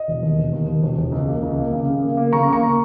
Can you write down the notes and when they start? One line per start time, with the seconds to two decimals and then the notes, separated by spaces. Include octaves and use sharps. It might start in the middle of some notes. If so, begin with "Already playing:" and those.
Already playing: D#5
0.08 E1
0.22 D#2
0.38 E1
0.53 D#2
0.68 D#2
0.83 E1
0.97 E1
1.12 C#2
1.28 A#3
1.43 C#2
1.58 A#3
1.73 C#3
1.88 C#3
2.02 A#3
2.17 A#3
2.32 C#3 A#5 C#6
2.48 A#3 A#5 C#6
2.63 A#3